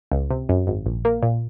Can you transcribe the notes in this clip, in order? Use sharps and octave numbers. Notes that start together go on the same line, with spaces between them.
C#2
C3
F#2
G#1
A#1
A#3
A#2